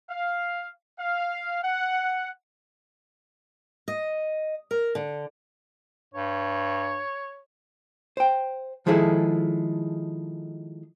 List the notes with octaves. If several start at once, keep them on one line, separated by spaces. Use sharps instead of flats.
F5
F5
F#5
D#5
A#4
D3
G2 C#5
C5 G5
D#3 F3 G#3 E4 G#4 A4